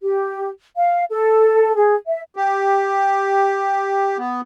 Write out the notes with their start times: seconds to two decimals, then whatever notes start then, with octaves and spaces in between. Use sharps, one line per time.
0.02 G4
0.77 F5
1.10 A4
1.76 G#4
2.07 E5
2.36 G4
4.18 B3